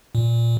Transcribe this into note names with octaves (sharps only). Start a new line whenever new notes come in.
A#2